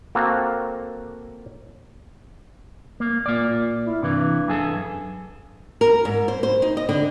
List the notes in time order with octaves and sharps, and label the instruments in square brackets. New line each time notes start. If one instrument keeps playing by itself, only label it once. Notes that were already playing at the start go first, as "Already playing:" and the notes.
[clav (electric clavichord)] A#3 C4 F#4 A4
[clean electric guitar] A#3
[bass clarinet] A#2 [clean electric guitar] A#3 D5
[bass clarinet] A#2
E4
[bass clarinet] G2 [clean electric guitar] C3 E3
[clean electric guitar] F#2 G#4 A4
[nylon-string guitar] A#4
G#2
C5
C5
D#4
D#5
D3